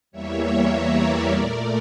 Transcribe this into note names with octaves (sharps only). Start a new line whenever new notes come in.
E2 E3 G3 A#3 C#5 E5
A#4 D5
A#2 A3 A#4 D5